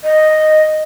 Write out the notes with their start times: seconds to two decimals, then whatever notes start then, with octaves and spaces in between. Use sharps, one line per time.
0.04 D#5